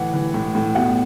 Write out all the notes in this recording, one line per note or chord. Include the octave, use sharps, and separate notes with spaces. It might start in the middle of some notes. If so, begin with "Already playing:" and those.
Already playing: A2 E3 F#5
E3
A2
A2
B2 F#5